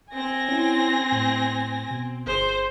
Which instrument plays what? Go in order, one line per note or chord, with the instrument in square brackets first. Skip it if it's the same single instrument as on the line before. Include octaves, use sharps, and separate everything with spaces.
[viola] C4 [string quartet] G#5 A#6
[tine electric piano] C#4 E4
A2
B2
[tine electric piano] G1 G#4 [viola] C5